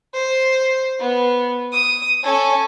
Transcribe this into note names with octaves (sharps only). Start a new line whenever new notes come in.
C5
B3
D#6
C#4 A4